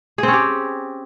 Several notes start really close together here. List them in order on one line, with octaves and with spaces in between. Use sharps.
G#4 C4 C#4 G4